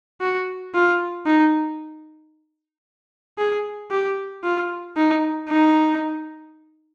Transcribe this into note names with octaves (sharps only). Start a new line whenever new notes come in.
F#4
F4
D#4
G#4
G4
F4
D#4
D#4